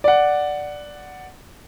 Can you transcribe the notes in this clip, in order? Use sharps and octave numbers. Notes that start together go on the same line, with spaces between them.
D5 F#5